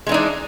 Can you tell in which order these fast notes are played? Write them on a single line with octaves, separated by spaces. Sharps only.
G#3 E3 D#4 D4